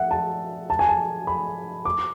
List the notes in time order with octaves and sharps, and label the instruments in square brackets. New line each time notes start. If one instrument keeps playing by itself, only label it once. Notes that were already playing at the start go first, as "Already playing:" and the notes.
Already playing: [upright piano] E5 F#5
A5
A5
G#5
A5
B5
D6